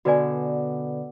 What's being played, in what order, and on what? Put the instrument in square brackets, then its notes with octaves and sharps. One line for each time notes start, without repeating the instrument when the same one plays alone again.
[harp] B2 D3 [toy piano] F#4 B4 D5 G#5